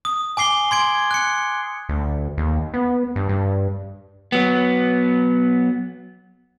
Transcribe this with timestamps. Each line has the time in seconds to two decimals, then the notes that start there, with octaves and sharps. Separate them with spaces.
0.05 D#6
0.37 G#5 D6 C7 G7
0.71 C6 G#6 D7
1.11 F#6 C#7
1.89 D2
2.38 D#2
2.74 B3
3.16 G2
3.29 G2
4.32 F#3 B3